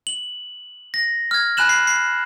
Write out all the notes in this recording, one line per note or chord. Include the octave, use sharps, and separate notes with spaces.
F#7
A#6
F6 G#6
G#5 B5 F#6 E7 F#7
C7
C7